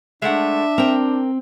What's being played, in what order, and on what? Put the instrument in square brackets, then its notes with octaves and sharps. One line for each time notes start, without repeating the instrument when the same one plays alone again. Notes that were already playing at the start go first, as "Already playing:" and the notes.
[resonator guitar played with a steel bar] G#3 A3 F#5 [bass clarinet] D4 [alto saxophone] E5
[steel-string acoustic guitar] C4 [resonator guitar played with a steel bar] A#4 G5